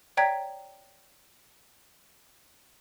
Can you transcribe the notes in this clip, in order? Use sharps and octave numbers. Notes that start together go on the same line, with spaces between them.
C#5 D5 G5 A#5 G#6 B6